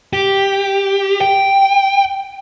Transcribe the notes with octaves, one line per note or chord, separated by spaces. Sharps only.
G4
G5